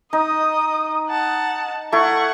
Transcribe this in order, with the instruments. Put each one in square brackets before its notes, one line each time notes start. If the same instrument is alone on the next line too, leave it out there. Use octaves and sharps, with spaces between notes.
[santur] D#4 [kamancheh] D#5 D#6
[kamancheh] F#5 A5
[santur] A3 E4 [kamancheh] F#5 C#6